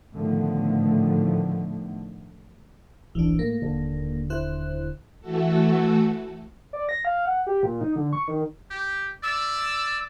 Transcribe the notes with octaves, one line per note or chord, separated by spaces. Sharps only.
A2 D3 D#3 F3 A3 B3
D1 A#1 E3 D4
A2 A#3
D#1 D3
E4 C5 F#6
E3 A3 F#4 A4
D5
A#6
F5
F#5
G4
A#2
D#4
D3
C#6
D#3
G4
D5 E6